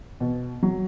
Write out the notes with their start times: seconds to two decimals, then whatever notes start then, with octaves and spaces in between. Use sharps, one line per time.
0.20 B2
0.63 F#3